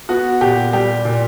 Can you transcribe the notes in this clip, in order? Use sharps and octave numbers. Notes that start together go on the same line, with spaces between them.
B3 F#4
A#2 G4
G3 G4
A#2